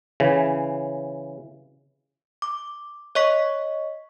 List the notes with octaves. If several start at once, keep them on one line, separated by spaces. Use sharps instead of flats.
C#3 E3
D6
C#5 D#5 C#6 B6